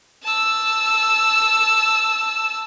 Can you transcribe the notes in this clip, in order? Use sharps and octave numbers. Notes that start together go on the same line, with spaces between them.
A5 E6